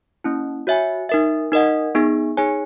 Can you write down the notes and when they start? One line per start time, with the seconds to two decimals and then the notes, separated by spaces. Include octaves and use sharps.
0.24 A#3 C#4 E4
0.67 F#4 C#5 E5 G#5
1.09 D#4 A#4 E5
1.52 D#4 A#4 D#5 F#5
1.95 B3 D#4 G#4
2.37 D#4 G#4 C#5 G#5